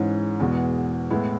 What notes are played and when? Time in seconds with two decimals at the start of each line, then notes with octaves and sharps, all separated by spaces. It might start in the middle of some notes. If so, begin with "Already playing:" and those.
Already playing: G#2 E3 G#3 C#4
0.40 E2 B2 G#3
1.10 A2 G#3 B3 E4